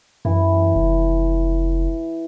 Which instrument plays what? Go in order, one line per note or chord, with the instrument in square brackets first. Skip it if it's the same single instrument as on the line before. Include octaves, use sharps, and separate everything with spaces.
[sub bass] F#2 [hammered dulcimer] E3
[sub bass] F1